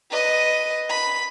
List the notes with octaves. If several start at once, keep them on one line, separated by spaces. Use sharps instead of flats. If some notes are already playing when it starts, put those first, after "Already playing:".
B4 D#5
B5